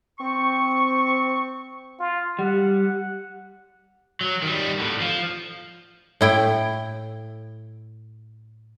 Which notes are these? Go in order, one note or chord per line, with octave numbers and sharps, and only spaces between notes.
C4 C#6
F4
G3 F#5
F#3
D#3 G3
A2 D3
F3
A2 E4 G5